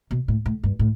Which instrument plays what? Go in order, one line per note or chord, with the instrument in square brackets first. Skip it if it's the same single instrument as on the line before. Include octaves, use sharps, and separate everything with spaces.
[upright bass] B2
A2
A2
G2
A2